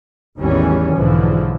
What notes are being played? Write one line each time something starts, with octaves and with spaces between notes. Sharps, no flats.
A1 E2 D#3 E3 G3 C#4
B1 G#2 D3 E3 F3